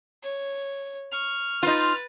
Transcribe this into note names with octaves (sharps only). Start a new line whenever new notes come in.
C#5
C#6 F6
D#4 F4 B4 A6